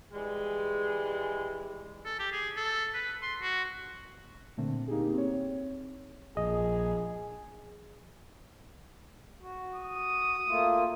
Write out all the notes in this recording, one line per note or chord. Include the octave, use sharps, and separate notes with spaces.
E3 G3 G#3
A4
G4
G#4
A4
B4
C6
F#4
A#2 D3 A3 C4
A#3 D#4 G4 G#4
C4 C#5
A#1 G#4 D#5
F#4
D#6
A3 A#3 F4